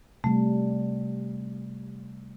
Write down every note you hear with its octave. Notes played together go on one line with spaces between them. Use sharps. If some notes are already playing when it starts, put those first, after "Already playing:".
C3 G3 A3